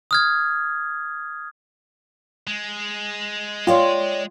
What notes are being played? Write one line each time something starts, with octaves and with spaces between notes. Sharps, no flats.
D#6 F6 G#6
G#3
F4 C#5 D5 G5